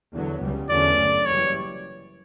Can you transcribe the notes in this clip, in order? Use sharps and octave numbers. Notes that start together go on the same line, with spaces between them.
E2 D3 F#3 B3
C#2 C#3 G3
E2 D3 F#3 A3 C#4 D5
G1 F#2 D3
F#1 F#2 E3 G3 C#5